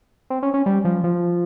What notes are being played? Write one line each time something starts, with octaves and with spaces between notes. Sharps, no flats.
C4
C#4
C#4
G3
F3
F3